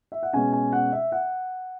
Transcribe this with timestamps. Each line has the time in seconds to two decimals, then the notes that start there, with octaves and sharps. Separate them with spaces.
0.12 E5
0.23 F#5
0.33 B2 G#3 C#4 G#5
0.53 G#5
0.72 F#5
0.92 E5
1.12 F#5